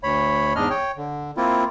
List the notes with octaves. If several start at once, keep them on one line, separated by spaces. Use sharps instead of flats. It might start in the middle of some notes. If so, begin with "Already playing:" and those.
D2 C#5 B5
E2 G#2 D4 D#5 F6
C#5 G5
D3
A#3 C4 E4 F4